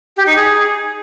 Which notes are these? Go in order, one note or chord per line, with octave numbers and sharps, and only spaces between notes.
G4
D#4
G#4